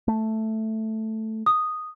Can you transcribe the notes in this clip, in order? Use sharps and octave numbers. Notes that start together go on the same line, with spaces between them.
A3
D#6